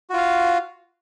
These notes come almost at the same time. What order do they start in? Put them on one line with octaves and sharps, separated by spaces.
F#4 F4 F5